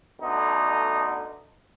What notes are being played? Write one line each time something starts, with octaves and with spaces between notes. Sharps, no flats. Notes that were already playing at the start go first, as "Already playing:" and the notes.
B2 D3 A3 D#4